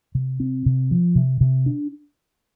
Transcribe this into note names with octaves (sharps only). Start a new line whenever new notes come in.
C3
C4
C3
F3
C3
C3
D4